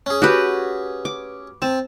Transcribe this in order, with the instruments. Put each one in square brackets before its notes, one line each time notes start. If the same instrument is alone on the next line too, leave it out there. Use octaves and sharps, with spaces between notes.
[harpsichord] C#4 G#4
[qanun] F#4 G4 B4
D6
[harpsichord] C4 [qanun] A5